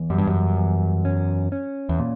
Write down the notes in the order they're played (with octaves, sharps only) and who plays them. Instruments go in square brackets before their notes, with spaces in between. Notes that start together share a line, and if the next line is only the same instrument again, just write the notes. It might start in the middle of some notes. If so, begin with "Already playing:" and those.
Already playing: [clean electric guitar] E2
[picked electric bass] F#2 [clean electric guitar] G3
[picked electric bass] G2
F#2
[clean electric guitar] E2
C#4
C#4
[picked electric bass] E2
[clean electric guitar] A#2